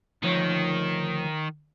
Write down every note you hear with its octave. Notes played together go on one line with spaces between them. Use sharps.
D2 D#3 F3 C#5